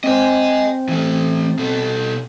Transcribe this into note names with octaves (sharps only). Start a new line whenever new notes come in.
C4 C5 D#5 G#5
E3 A3
B2 A4